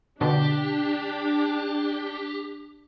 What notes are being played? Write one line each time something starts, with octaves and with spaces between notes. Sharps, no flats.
B2 D3 D4 G4